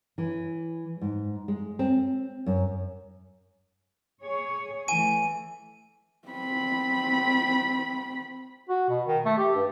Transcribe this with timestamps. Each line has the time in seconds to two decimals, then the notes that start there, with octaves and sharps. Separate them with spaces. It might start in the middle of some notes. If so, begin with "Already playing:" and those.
0.18 E3
1.01 G#2
1.48 G#3
1.79 C4
2.46 F#2
4.22 G#4 C#5
4.88 E3 A3 G#5 D#7
6.28 C4 B5
8.69 F#4
8.90 B2
9.07 D#3
9.26 A3
9.38 G4
9.55 G2